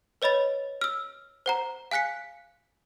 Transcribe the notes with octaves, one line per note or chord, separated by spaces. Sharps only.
B4 C#5 D#5 B5 A6
E6 F6
C5 F#5 A#5
F5 G#5 F#6 B6 C#7